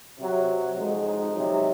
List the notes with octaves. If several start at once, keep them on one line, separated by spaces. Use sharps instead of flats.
C3 F#3
F2 D#3 G#3
D#4
C3 F#3